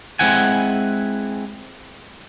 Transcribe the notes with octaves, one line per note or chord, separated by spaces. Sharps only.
G#3 A#3 C4 E4 F#5 G#5